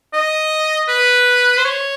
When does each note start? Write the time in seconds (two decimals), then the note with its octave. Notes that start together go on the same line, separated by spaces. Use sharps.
0.13 D#5
0.88 B4
1.58 C5
1.64 C#5